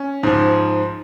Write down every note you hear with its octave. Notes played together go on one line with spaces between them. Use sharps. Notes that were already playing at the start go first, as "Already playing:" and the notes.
Already playing: C#4
G#2 F3